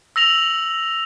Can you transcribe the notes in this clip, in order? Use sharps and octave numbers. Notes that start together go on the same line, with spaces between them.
E6 A#6 F7 F#7